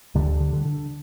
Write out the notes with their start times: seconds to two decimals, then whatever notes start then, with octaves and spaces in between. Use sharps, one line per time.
0.15 D2 D3 G3
0.40 D3
0.53 D3
0.65 D3